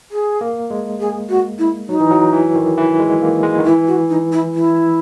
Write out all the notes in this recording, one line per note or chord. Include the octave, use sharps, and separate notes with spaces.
G#4
A#3
G#3
G#4
F#4
E4
F#3 D#4
E3
F#3
E3
D#3
E3
G#3
A#3
G#3
D#3
E3 E4
F#4
D#4
E4
E4